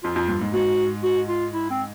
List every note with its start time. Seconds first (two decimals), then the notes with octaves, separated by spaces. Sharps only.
0.04 F2 F4
0.16 F2
0.28 G2
0.41 G#2
0.54 G#2 F#4
1.03 F#4
1.29 F4
1.54 E4
1.71 C4